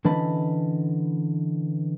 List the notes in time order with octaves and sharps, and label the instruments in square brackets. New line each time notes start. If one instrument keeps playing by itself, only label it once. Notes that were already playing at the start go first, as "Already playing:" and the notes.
[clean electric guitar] D3 E3 C#4 D#5 A5 B5